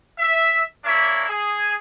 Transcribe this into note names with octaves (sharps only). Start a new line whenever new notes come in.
E5
A#3 D4 E4 C#5 E5
G#4